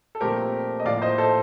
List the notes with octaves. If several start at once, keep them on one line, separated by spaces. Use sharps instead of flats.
A4
A#2 F3 A3 C4 G4 A#4
D#5
A2 F3 A#3 D5 F5
C5 D#5
A4 C5